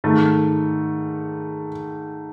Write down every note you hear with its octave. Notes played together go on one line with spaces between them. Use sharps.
G#2 D#3 A3